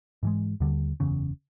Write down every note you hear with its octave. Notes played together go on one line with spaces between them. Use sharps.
G#2 E3 G#3
D#2 D3 G3
F#1 E2 C#3